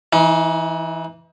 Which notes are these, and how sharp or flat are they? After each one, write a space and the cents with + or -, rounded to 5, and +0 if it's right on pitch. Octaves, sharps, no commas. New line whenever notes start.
E3 +5 D#4 +40